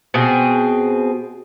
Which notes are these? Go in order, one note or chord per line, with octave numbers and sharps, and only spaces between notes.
B2 C4 G#4